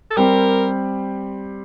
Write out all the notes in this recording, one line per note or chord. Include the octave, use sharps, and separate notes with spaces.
A4
G3 C4 G4 A#4